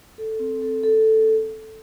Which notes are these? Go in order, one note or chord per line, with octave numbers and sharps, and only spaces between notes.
A4
C4
A4
A4